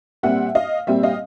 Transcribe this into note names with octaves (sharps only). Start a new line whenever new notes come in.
A#2 G3 C4 E5 F#5
D#5 F5
A#2 G3 C4 E5
D#5 F5